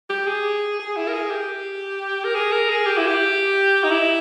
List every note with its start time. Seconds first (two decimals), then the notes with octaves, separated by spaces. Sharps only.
0.10 G4
0.27 G#4
0.80 G#4
0.97 E4
1.08 A#4
1.14 G#4
1.31 G4
2.25 A#4
2.35 G#4
2.52 A#4
2.70 G#4
2.87 G4
2.98 E4
3.07 G4
3.84 D#4
3.90 E4